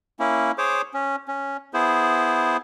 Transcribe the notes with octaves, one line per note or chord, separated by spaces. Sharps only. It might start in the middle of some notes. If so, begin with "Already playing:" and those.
A#3 C#4 E4
G#4 C5 C#5 D6
C#4
C#4
B3 E4 G#4 C5